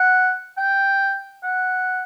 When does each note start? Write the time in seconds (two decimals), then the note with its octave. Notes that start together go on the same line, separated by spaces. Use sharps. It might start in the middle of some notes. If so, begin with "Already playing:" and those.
Already playing: F#5
0.58 G5
1.43 F#5